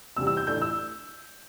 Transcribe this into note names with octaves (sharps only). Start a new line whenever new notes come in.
E2 C3 G3 C4 E6
E6
G6
A1 A2 A3 D4 G6
E6